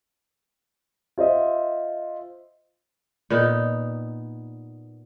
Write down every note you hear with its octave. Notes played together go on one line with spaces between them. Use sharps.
F4 C5 D#5 E5
A#2 B3 D#4